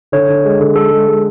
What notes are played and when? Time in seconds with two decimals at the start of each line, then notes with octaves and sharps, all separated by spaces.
0.12 D3 C#5
0.28 D3
0.45 G#3
0.59 D3
0.75 G#3 A4
0.91 G#3
1.07 G#3